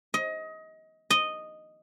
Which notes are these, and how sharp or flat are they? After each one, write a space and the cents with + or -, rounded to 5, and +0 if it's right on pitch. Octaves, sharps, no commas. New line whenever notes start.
D#5 +25
D#5 -5